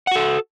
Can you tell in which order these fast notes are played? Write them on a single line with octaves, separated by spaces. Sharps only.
F#5 F#4 A4